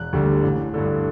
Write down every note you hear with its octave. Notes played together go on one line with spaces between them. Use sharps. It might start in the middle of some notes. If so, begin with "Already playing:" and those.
Already playing: E1 F#6
D2 D3 G3
A1
G2 D3